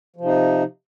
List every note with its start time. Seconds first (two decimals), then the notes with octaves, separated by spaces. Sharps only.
0.16 F3
0.21 C3
0.25 D#4